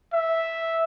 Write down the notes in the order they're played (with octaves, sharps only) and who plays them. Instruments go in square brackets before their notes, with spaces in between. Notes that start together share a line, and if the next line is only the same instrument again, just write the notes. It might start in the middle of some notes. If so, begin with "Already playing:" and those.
[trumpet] E5